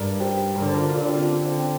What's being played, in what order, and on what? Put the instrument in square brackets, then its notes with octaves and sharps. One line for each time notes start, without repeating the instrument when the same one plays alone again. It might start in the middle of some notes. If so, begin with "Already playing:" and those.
Already playing: [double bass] G2 [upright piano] A#4 D5
[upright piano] G4 C5
[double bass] D3 [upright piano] A#4
[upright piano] C5
F4 A#4
F4
[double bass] D3 [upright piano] D4
[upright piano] G4
C4 F4
C4
C4